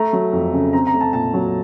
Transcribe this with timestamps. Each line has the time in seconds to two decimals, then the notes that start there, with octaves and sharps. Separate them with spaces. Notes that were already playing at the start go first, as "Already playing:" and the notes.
Already playing: A3 A#5
0.13 F#3
0.33 F2
0.53 C#3
0.73 C4 A#5
0.87 A#5
0.94 A3
1.01 A5
1.13 A#2 A5
1.34 F#3